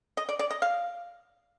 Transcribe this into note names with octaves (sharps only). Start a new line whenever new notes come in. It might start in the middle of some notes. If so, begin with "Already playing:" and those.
D#5
D5
D5
D#5
F5